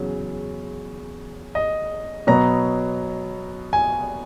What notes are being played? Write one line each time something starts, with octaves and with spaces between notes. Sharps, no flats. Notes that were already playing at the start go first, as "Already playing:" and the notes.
Already playing: E2 C#3 F#3
D#5
B2 F#3 B3 A#5
G#5